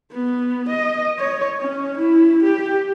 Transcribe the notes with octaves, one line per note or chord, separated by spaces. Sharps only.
B3
D#5
C#5
C#4
E4
G4